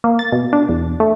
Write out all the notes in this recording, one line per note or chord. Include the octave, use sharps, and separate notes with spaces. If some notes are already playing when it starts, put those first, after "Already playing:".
A#3
A6
B2
D4
E2
A3